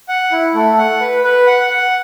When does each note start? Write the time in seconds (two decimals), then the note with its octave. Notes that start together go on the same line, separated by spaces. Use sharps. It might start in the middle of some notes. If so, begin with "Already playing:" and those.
0.09 F#5
0.32 E4
0.54 A3
0.78 F#5
1.01 B4
1.24 B4
1.47 F#5
1.70 F#5